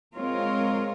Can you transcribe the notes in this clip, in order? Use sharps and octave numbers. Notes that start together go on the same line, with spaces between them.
G#3 C4 F4 A#4 C#5